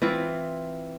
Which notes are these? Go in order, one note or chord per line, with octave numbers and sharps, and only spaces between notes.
E3 C4 E4 F4